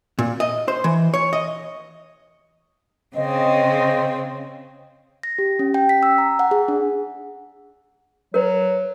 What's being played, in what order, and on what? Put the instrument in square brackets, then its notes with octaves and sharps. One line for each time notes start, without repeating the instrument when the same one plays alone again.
[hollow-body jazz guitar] A#2
D#5
C5
E3
C#5
D#5
[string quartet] C#3 C4 [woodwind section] D#5
[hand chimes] A#6
G4
C#4
G5
B6
E6
A#5
F#5
G#4
D4
[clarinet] F#3 [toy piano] A#4 B4